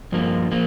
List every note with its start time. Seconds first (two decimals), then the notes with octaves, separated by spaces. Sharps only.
0.12 G2 F3 A#3
0.52 F3 A#3